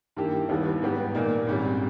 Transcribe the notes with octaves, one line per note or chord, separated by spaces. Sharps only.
G2 D#3 A#3 E4 G4
D#2 D#3 G3 B3 E4
G#2 G3 B3 G4
A#2 A#3 D#4
G#1 G#2 G3 C#4